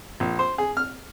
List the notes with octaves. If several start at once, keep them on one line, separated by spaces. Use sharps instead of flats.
A#1
C5
G#4
F6